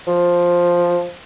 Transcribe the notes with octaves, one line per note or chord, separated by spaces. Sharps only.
F3